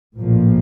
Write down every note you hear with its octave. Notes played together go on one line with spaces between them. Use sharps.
A#1 A2 F3 A#3